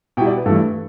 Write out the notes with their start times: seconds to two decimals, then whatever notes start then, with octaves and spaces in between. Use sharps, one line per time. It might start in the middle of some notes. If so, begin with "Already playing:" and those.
0.17 B2 G3 E4 G5
0.27 D5
0.37 B4
0.46 G2 E3 A3 A4